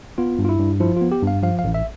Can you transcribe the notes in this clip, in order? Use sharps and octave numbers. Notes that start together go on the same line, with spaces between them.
B3 F4
G2
F4
E4
G2
F3 E4
B3 F4
G4
G2
F5
F3 F5
F5
A1
E5